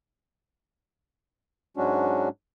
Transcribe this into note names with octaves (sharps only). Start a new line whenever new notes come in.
G#2 F#3 G#3 C#4 D4 F#4